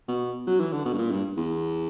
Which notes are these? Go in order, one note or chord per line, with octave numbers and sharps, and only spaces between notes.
B2
F#3
E3
D3
B2
G2
A#2
G2
E2